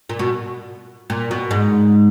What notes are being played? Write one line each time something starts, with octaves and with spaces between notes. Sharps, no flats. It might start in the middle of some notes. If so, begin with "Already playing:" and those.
A#2
B2
A#2
B2
G#2 G#3